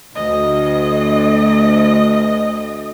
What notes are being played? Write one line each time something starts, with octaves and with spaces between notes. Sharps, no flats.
D2 D#5